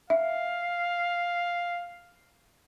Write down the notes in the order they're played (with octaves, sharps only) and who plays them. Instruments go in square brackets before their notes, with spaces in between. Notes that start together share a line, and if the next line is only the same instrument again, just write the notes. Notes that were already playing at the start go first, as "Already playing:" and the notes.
[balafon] E5 [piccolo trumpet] F5